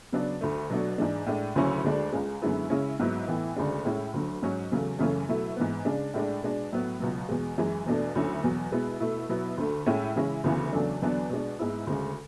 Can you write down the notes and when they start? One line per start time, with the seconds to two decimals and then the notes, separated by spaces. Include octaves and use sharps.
0.12 C#3 F#3 B3 D4
0.41 D2 D3 A3
0.70 B2 F#3 A3 D4
0.98 G#2 E3 G#3 D4
1.26 A2 G#3 D4
1.56 D2 C#3 F#3 C#4 E4
1.84 D2 D3 G#3 D4
2.12 C#2 C#3 G#3
2.42 F#2 D3 G#3 B3 E4
2.70 C#3 G#3 C#4 E4
2.99 G#2 F#3 B3 E4
3.27 A2 E3 B3 E4
3.56 D2 C#3 G#3 D4
3.85 A2 G#3 C#4 E4
4.14 D2 D3 F#3
4.42 G#2 F#3 C#4
4.71 E2 C#3 F#3 A3
4.99 F#2 C#3 E3 A3 C#4
5.29 B2 F#3 A3 E4
5.56 G#2 E3 B3
5.85 C#3 G#3 D4
6.14 A2 G#3 D4
6.43 B2 G#3 D4
6.72 A2 F#3 B3
7.00 C#2 B2 F#3
7.29 E2 B2 G#3
7.58 F#2 E3 G#3
7.86 E2 B2 A3 D4
8.15 D2 D3 F#3 C#4 E4
8.43 E2 B2 F#3
8.72 B2 G#3 B3 E4
9.00 B2 A3 E4
9.29 B2 F#3 B3 E4
9.58 D2 D3 A3
9.86 A2 G#3 C#4 E4
10.16 C#3 E3 G#3 C#4 E4
10.44 D2 C#3 E3 B3 E4
10.73 E2 C#3 F#3 A3 D4
11.02 E2 D3 F#3 B3 D4
11.30 B2 G#3 D4
11.59 G#2 G#3 B3 E4
11.87 D2 C#3 G#3